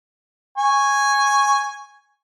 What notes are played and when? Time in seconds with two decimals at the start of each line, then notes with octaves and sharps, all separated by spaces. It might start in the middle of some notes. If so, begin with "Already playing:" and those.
0.58 G#5 C#6